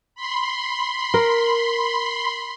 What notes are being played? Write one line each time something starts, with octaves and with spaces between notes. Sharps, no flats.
B5 C6
A#4